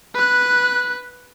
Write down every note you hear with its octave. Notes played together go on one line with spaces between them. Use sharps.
B4 F#6